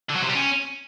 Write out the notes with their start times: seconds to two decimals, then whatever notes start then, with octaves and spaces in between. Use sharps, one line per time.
0.10 D3
0.16 F#3
0.22 C3
0.29 G3
0.35 C#4